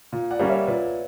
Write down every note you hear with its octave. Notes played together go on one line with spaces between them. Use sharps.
A#2
D5 F#5
G3 A#3 C#4
C#5 E5
A#2 B4 D5